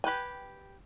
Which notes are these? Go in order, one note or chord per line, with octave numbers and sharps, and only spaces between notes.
G4 B4 G5 G#5